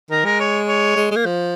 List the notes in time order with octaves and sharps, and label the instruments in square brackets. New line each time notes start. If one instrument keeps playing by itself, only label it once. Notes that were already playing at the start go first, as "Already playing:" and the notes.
[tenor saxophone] D#3 [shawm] A#4
[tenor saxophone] G#3 [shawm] A#4
[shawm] C#5
C#5
[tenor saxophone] G#3
G#3
A#3
F3